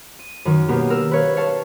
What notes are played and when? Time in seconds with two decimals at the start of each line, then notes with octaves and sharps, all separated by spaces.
0.19 D#7
0.45 F#2 D#3
0.68 B2 A#3 B3 G4
0.90 A#4 E6
1.11 B4 C#5 F5
1.37 C#5 F5 A5